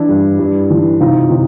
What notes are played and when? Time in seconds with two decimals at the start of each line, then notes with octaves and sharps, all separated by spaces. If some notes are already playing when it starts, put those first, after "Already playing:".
Already playing: E3 D4 E4
0.09 G2
0.39 G2
0.70 E3
1.00 C3 D#4 F4
1.30 C3